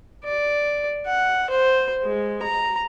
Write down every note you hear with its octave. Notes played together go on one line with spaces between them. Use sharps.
D5
F#5
C5
G#3
A#5